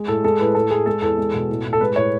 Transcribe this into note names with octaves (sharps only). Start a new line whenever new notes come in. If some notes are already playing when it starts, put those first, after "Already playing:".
Already playing: G#3
A2 A4
G#3 A4
A2 B4
A2 A4
A2 G#4
G#3 A4
E2 A4
G#3
B2
A2
A2
A4
G#3 B4
A2 C#5